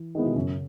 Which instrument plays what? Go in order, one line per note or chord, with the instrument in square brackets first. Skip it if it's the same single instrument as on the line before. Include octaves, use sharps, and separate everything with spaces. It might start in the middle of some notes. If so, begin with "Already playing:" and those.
Already playing: [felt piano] E3
[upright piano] D#3 G#3 B3 E4
[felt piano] B2
[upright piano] F#2 [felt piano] C#3